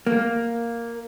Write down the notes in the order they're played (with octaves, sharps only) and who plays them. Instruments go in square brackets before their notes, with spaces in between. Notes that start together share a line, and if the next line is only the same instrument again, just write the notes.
[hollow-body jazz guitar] A#3